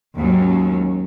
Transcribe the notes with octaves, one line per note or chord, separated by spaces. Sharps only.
D#2 G#2 F#3 C#4